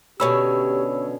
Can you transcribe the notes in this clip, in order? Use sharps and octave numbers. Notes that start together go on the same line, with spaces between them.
B2 D3 C#4 G4 C#5 B5 E6